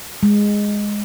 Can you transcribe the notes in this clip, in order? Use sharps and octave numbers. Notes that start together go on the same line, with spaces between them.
G#3